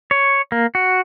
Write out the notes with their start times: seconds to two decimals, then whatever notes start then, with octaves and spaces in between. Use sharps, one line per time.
0.11 C#5
0.52 A#3
0.75 F#4